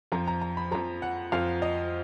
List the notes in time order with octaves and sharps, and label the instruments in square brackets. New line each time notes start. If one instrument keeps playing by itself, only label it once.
[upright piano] F2 F3 A#5
A#5
A#5
B5
F2 F3 A#5
F#5
F2 F3 F5
D#5